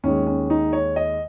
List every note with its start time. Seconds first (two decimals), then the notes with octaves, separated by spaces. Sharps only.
0.03 D#2 D#3 G#3 C#4
0.27 C#4
0.50 D#4
0.73 C#5
0.96 D#5